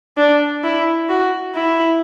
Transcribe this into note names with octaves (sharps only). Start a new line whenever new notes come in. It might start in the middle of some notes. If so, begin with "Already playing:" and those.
D4
E4
F#4
E4